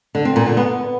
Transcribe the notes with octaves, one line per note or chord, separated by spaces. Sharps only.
D3
C4
A#2
D3
B3